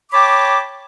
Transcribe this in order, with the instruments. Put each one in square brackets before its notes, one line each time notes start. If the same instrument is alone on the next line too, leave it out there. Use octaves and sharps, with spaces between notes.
[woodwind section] C#5 G5 A5 B5 D6